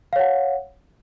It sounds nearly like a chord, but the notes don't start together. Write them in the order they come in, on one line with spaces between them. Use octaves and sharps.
F5 C#5 F#5